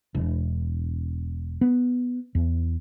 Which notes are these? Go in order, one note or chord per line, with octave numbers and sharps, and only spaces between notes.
E1
B3
E2